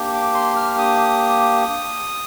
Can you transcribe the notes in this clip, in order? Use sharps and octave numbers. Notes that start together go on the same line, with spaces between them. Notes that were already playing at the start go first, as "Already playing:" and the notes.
Already playing: A#3 D4 G4
D6
C6
F6
D#6